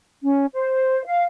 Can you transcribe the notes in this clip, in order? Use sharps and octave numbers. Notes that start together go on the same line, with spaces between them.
C#4
C5
F5